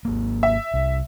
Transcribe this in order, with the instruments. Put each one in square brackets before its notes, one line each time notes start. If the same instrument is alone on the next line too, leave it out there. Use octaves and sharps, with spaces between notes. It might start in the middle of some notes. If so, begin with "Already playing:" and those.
[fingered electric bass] G#1 A#3
[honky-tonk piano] E5
[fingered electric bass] C2